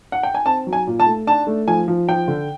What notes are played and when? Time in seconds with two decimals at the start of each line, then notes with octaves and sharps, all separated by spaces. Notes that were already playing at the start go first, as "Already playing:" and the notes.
0.12 F#5
0.23 G5
0.35 G#5
0.46 C4 A5
0.67 F#3
0.73 G#5
0.87 A#2
1.00 A5
1.06 A3
1.27 D4 A5
1.47 A3
1.68 F3 G#5
1.88 F3
2.09 F3 G5
2.28 D3